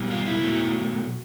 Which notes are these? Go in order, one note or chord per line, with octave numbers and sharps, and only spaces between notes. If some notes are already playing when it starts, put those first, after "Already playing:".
Already playing: B2 G3
F4
E4
B2 F#3 A3